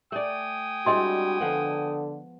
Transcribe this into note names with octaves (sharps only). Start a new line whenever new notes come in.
A3 D5 G5 G#5 D#6
G3 G#3 C4 D4 E4 F#4 D#5 C6
D3 F3 B3 A4